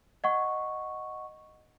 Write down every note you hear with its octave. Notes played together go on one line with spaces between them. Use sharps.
D#5 F#5 C#6